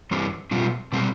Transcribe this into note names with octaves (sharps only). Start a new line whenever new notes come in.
G2 E3 G3 C4
B2 G3 C4 F4
B2 G3 C4